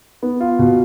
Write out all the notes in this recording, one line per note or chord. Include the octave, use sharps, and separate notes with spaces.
B3
F4
B2